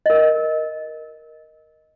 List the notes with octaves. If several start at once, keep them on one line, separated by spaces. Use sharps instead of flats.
A#4 D#5